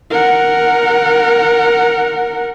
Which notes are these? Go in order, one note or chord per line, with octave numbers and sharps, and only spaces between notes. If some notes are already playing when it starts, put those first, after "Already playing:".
A#4 F#5